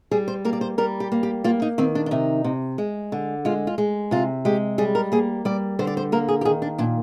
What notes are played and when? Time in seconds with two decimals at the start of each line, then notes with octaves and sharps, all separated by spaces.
0.11 G3 G#4
0.28 C5
0.45 A#3 A#4
0.53 D5
0.61 C5
0.78 G3 A#4
1.00 G4
1.12 A#3
1.23 G4
1.44 A#3 F4
1.62 D#4
1.78 D#3 C4
1.95 D4
2.06 D4
2.11 C3 D#4
2.44 C3
2.78 G#3
3.12 D3
3.45 G#3 F4
3.67 F4
3.78 G#3
4.11 C3 F4
4.45 G#3 G4
4.78 G3 G#4
4.95 A#4
5.12 A#3 G#4
5.45 G3 D5
5.79 D3 C5
5.87 D5
5.97 C5
6.12 A#3 A#4
6.28 G#4
6.41 G4
6.45 D#3 G#4
6.62 D4
6.78 A#2 D4